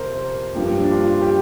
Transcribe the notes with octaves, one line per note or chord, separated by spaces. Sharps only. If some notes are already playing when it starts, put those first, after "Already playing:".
Already playing: F2 C3 A#4 C5
G2 F3 A#3 G4
D4
F4
G4